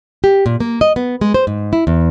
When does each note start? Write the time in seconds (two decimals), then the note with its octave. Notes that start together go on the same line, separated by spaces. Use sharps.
0.24 G4
0.46 A#2
0.60 A#3
0.81 D#5
0.96 B3
1.21 G#3
1.34 C5
1.47 G#2
1.73 E4
1.87 E2